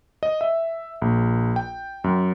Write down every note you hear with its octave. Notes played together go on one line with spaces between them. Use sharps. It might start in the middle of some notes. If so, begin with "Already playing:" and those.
D#5
E5
A#1
G5
F#2